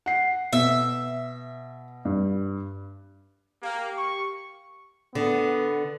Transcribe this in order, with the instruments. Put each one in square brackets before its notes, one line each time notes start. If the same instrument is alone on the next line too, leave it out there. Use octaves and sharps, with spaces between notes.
[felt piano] F#5 C7
[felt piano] B2 [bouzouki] E5
[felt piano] G2
[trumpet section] A#3 [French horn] G4
[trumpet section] C#6
[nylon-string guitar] D3 [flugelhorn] B3